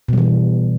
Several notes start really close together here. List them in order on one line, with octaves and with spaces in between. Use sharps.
B2 G3 E3